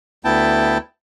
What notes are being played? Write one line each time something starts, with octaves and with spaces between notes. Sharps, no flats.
D2 B3 E4 G5 A5